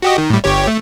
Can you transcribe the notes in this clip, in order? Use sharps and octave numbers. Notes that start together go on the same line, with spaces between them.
F#4 G4 D#5
D#3
A2 G3
G1 G4 C#5
A3